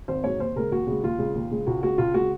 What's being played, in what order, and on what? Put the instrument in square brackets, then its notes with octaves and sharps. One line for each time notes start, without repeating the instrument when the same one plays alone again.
[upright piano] G#1 C5
G#2 F#3 C#5
D#2 C5
C#3 G#3 A#4
D#2 F#4
C#3 G#3
D#2 F4
C#3 G#3
D#2
C#3 G#3
C#2 F#4
C#3 G#3 F#4
C#2 F4
C#3 G#3 F#4